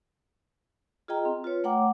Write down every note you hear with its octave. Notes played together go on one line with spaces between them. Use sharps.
F4 G#4 D#5 G5 A#5
C4
F4 B4 C#5
A3 C#5 F#5 G5 A#5 D6